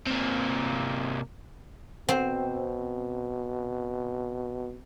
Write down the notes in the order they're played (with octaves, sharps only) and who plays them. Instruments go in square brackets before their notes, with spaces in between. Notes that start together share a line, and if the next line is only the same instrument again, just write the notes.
[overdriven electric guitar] C3 A#3
[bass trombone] B2 [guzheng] C4